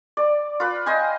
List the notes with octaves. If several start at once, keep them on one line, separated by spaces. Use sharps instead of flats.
D5
F4 B4
D#5 G5 G#5 C6